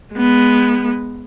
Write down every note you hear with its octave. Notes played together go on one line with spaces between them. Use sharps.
G#3 B3